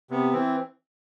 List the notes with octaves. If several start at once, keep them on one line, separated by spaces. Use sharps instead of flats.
C3 B3
E3 C4